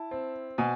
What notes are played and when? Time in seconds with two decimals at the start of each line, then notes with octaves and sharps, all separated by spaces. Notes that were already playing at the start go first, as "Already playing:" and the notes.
Already playing: E4 A5
0.11 C4
0.58 B2 G#5